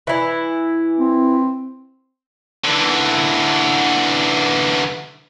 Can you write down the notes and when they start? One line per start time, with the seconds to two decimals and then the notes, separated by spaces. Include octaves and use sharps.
0.07 E3 E4
0.99 C4
2.64 D3 E3